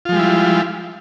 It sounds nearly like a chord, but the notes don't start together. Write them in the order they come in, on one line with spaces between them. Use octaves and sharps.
F4 F3 G#3 G3 E4